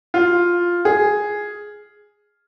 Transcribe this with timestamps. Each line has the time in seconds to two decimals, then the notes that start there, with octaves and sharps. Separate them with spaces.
0.14 F4
0.85 G#4